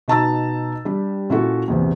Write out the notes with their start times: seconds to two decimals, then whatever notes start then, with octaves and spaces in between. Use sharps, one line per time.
0.08 B2 D#4 A5 A#5 E6 A6
0.85 G3 D4 G4
1.30 A#2 C#4 E4 F#4 A4
1.68 A#1 E2 C3